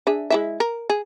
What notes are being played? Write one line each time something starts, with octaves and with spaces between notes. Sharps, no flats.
D4 G#4 E5
G#3 E4 E5
A#4
G#4